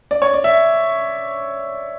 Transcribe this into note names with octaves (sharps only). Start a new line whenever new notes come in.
D5
C#5
D5
E5